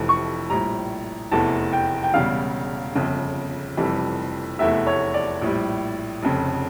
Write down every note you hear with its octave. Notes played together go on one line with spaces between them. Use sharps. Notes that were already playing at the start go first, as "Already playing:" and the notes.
Already playing: F1 F2 E3 A3
C#6
A#1 A2 G3 A#5
F1 E2 E3 A3 A5
G5
G5
E1 E2 C#3 G3 F5
G1 F2 C#3
F1 F2 E3 G3
F1 E2 E3 A3 E5
C#5
D5
A#1 A2 G3
F1 F2 C#3